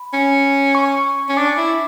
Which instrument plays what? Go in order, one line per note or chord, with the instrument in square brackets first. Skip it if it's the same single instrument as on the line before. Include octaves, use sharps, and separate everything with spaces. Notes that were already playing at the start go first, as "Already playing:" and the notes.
Already playing: [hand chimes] B5
[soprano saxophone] C#4
[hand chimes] C#6
[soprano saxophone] C#4
[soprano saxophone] D4 [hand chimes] D6
[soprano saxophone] E4